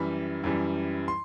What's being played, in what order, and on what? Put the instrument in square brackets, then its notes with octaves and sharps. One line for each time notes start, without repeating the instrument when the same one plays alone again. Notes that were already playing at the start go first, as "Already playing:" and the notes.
Already playing: [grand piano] F#2 E3 G3 B5
F#2 E3 G3
C6